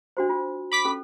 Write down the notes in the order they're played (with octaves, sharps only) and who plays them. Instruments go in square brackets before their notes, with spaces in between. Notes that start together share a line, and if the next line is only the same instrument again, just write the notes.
[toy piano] D4 F#4 C5
F4
[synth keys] B5 D6 B6
[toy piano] C#4 A4